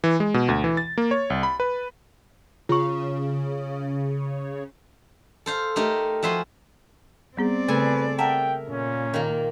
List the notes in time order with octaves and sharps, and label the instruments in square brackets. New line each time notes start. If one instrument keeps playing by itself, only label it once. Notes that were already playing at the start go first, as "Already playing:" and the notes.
[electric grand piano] E3
G#3
B2
D2
E3
A6
A#3
C#5
C2
B5
B4
[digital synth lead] C#3 [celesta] F4 C#6
[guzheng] A4 C5 F5
A3 D#4 G4 A#4
F3 F#4 E5 G#5 C6
[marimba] G3 B3 G#4 [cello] C4 D5
[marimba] C#3 A3 [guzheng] G#4 A4 G#5 [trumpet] B4
[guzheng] A#4 E5 [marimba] F#5 A5 A#5 [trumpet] G5
[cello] A#2 [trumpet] C#4
[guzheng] D#3 A#3